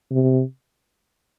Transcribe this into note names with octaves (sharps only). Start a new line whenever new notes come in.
C3